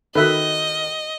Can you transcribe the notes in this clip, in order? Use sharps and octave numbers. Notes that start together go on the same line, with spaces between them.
D#3 F#4 A4 B4 D#5 E5